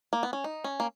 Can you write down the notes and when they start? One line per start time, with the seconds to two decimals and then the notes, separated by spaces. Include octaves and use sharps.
0.13 A#3
0.23 B3
0.33 C#4
0.44 D#4
0.64 C#4
0.80 A#3